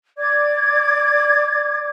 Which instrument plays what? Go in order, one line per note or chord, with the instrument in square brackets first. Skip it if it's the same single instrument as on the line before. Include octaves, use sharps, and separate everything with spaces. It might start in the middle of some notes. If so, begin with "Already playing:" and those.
[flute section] D5 D6 G#6